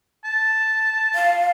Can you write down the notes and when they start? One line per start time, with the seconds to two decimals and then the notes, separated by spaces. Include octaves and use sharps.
0.25 A5
1.15 F5